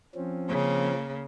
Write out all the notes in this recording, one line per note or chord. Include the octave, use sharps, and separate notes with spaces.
F3 C4 C#4
C#3 A#3